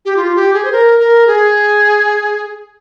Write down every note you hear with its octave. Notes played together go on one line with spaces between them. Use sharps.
G4
F4
G4
G#4
C5
A#4
A#4
G#4